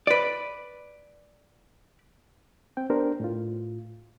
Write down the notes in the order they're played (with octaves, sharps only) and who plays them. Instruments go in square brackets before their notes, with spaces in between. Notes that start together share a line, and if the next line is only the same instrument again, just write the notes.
[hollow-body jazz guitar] B4 D5
[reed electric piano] C4 G5
B3 D4 G4 A#4 C5
A2 F4